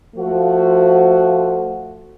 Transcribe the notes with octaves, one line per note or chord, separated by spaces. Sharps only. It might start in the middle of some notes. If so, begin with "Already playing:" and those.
F3 A3 F#4